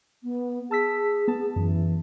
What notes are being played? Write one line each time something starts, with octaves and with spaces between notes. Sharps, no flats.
B3
G#4 A5 E6 B6
B3 A5
F#2 E3